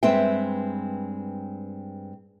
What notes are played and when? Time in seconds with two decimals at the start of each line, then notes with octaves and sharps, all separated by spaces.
0.03 G2 G#3 C4 B4 E5 G5